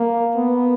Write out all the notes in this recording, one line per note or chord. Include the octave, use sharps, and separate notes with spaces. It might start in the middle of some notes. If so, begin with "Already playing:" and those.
Already playing: A#3
B3